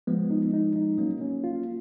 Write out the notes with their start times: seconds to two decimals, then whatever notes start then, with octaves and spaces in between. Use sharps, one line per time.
0.07 F3 G#3 B3
0.31 D#4
0.53 D#4
0.76 D#4
0.98 F#3 A#3 C#4
1.21 C#4
1.44 F4